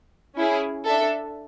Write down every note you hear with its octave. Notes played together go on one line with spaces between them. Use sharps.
C#4 E4 G#4
D4 A4 E5